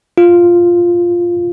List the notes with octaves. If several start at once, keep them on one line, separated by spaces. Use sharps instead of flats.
F4